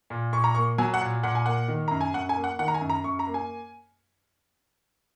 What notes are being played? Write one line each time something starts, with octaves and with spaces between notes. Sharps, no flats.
A#2
A#2 C#6
A#5
A#3 C#6
F#3 G#5
F#5
A#2
A#2 F#5
G#5
A#3 F#5
D#3
F#2 A#5
G#5
F#2 F#5
G#5
A#3
F#5
D#3 F#5
A#5
G#5
F#2
A#5
F#2 C#6
A#5
A#3
G#5